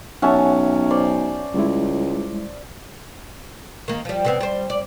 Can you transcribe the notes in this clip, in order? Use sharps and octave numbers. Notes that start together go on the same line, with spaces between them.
B1 C#4 C#5 E5 F#5 A5
C5 D5
C#2 G3 G#3 E4
D#3 A#3
F3 G3
C3 B3 C4
G3 C5
D5